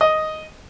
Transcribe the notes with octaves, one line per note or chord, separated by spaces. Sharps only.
D#5